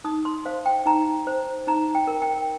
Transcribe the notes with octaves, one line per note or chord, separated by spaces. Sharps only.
D#4 D#6
C6
C5 F5
G5
D#4 A#5
C5
D#4 A#5
G5
A#4
G5